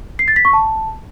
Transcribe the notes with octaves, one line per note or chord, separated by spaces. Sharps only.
C7
A6
B6
C#6
A5